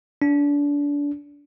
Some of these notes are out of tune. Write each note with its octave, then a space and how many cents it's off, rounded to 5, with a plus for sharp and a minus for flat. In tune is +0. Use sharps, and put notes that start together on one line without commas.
D4 -30